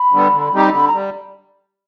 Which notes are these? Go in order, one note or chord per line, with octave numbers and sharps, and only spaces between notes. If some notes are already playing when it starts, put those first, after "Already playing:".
Already playing: B5
D3 G3 B3
D3
G3 C4 D#4 G4
D3 B5
A#5
G3